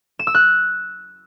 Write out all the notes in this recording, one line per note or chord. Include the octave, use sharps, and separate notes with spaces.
E7
E6
F#6